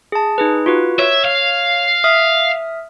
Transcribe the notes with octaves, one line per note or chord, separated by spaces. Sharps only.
G#4 A5
D#4 G#4 B4
F4 F#4 B4
C#5 E5
F5
E5 D#6 F6